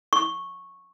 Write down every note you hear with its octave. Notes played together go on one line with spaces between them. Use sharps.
C#6